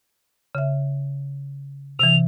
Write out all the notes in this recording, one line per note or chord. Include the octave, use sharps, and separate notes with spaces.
C#3 E5
C3 E3 F7